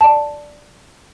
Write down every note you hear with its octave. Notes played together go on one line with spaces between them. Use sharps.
D5 A5